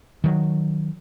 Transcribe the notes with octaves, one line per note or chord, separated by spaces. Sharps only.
D#3 F#3